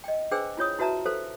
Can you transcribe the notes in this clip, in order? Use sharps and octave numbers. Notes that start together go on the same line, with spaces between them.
D#5 G5
D4 G#4 B4 C5 G5 E6
E4 F4 C#5 D#6
E4 F#4 B4 E5 A5 A#5
A4 B4 C5 F5